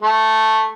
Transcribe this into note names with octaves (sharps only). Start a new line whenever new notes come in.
A3